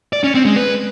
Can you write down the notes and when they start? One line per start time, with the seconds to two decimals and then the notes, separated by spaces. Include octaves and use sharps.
0.13 D5
0.24 C#4
0.35 C4
0.45 G#3
0.56 B4